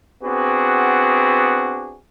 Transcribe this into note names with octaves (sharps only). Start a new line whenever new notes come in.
B3 C4 D4 F#4 G#4